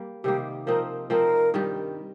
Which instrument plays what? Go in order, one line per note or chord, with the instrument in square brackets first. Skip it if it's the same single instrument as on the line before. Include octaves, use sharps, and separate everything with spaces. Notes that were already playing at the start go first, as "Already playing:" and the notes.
Already playing: [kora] G3 A#3
[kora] C3 D#3 G3 A#3 [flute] G4
[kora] F3 C4 D#4 [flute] A#4
[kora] F3 C4 D#4 [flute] A#4
[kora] G2 D#3 G3